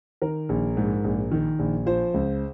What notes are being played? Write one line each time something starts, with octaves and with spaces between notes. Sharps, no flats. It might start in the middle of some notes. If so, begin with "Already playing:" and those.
D#3 A#4
A#1
G#2
A#1
D#3
A#1
F3 C5
C#2